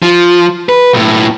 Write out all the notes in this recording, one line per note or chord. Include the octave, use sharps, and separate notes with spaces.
F3
B4
B1 A2